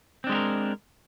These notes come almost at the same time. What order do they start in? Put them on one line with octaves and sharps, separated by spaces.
C4 D4 G#3 G4 A#4